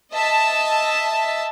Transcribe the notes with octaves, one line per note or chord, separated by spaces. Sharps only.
D#5 E5 A5